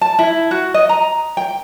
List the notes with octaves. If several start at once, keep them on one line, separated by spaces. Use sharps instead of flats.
A5
E4
F#4
D#5
A#5
G5